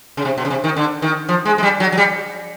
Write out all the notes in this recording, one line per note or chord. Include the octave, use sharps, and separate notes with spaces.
C#3
C3
B2
C#3
C3
D#3
D3
D#3
F3
G#3
G#3
G3
F#3
F#3
G3